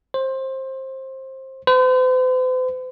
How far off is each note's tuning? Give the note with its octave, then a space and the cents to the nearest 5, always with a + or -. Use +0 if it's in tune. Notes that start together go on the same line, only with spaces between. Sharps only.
C5 +20
C5 -45